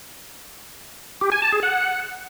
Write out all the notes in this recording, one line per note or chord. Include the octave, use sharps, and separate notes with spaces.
G4
G#5
A5
G#4
F#5